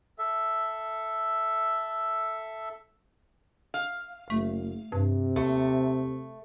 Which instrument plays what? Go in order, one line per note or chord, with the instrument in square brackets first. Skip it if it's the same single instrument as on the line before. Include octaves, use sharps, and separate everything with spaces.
[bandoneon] A4 E5
[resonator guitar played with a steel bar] F5
[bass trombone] F#1 [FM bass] A3
[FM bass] G2 [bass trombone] C3
[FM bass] D#2 [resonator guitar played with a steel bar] A3